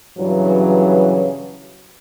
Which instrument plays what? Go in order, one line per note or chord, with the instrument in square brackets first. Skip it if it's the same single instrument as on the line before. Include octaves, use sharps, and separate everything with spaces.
[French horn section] G2 C#3 E3 F#3